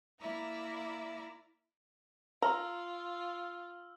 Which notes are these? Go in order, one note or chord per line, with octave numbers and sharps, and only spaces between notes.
A#3 E4 D5 E5 A#5
F4 A#5 E6 F6